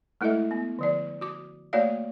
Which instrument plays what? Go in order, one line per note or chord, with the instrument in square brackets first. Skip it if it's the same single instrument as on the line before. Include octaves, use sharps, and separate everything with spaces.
[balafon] G#3 A3 E4 A4 D#5 E5
B3
D3 F3 D5
F#4 D6
A3 A#3 F#4 C#5 D5 F5